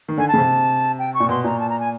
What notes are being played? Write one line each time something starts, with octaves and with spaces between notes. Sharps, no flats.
D#3
D3 G#5
A5
C#3
C3
G5
C#6
A#2
B2 C6
A#2 A#5
A5
A#5
G#5